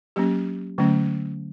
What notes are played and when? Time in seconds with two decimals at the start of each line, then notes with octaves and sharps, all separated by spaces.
0.16 F#3 A#3 C#4 G4
0.78 D3 F#3 A3 C#4